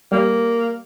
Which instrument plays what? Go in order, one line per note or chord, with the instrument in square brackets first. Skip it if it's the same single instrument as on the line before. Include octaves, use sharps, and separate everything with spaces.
[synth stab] G3 [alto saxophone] A#3